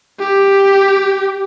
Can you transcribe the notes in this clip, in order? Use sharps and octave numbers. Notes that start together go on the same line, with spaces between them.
G4